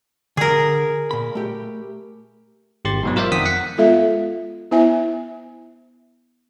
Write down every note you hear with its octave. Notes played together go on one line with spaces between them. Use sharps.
D3 G#4 A#4
A#2 B5
A3 G4
G#1 G4 C6 A6
G#2 B2 F#3
F4 A#4 C5 D5 E5 F5
F2 D#3 F#5 G5 D#6 B6
F#5 B6 C#7
G#3 B3 F4 A4 E5 F5
B3 E4 C5 E5 G#5